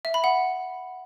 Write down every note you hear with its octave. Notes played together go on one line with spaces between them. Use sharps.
E5
B5
F#5